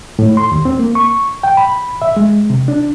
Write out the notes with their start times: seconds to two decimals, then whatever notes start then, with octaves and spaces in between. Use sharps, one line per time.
0.19 A2
0.37 C6
0.52 D#2
0.65 C4
0.79 A#3
0.95 C#6
1.43 G5
1.57 B5
2.02 E5
2.17 G#3
2.50 C3
2.68 D4